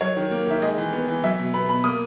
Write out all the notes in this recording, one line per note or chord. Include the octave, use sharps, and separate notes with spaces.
F#3 C#5
D#3
A#3
D#3 E5
G#3 D#5
E3
B3
E3
F#3 E5
B2
B3 B5
B2 B5
A#3 D#6